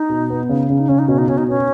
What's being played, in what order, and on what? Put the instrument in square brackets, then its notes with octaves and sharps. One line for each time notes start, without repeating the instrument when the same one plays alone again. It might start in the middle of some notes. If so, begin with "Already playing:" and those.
Already playing: [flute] D#4
[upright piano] B2
B3
C#3
[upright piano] C#3 [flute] C#4
[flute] D#4
[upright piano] C#3 [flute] C#4
[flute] D#4
[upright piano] B2 [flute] C#4
[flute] D#4
[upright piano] B2 [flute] C#4
[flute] D#4
[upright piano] B3 [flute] C#4